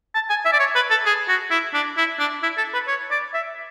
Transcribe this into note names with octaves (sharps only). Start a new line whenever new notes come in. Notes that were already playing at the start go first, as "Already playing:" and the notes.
A5
G#5
E5
D5
C#5
B4
A4
G#4
F#4
E4
D4
E4
D4
E4
A4
B4
C#5
D5
E5